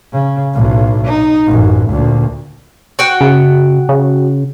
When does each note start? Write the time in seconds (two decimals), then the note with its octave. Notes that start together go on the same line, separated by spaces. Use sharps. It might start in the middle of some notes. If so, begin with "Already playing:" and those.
0.13 C#3
0.54 B1 A2
1.07 D#4
1.47 A1 F#2
1.89 D2 A#2
2.99 F#4 F#5 G5
3.21 C#3
3.89 C#3